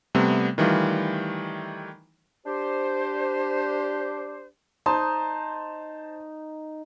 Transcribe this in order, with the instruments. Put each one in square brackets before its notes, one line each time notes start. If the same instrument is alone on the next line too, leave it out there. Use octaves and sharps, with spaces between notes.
[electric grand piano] C3 G3 A3 B3
D#3 E3 G3 A3 F4
[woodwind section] D4 G4 C5
[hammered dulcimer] D#4 [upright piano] C5 A5 C6